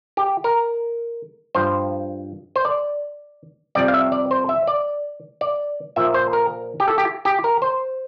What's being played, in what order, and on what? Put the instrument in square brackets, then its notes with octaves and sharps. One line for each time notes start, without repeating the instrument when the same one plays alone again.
[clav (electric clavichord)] G4
A#4
G2 F3 C5
C5
D5
F2 C3 G3 D5
F5
E5
D5
C5
E5
D5
D5
A#2 F3 E5
C5
A#4
G4
A4
G4
G4
A#4
C5